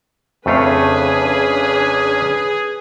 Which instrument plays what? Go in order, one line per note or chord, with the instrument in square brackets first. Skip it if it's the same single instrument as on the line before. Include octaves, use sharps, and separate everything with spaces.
[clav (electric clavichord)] F2 A3 F5 [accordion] C#3 C#4 D4 [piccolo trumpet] G#4 [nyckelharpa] B4